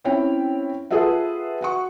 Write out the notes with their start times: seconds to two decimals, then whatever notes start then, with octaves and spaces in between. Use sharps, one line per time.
0.04 C4 C#4 E4 C#5 G5
0.91 F4 G#4 A4 B4 E5 F#5
1.61 F#4 F#5 C#6